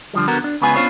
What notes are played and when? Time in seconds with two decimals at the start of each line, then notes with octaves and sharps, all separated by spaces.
0.13 D3 F3 G3
0.28 D3 B3 F#4 A#4
0.44 D4
0.62 C#2 C#3 B3 F4 B4 G#5
0.76 B3 C#4 D4 F4 C5 C#5